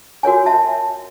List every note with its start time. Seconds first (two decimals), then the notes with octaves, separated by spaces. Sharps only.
0.23 F#4 A#4 C#5 G#5
0.46 E5 A5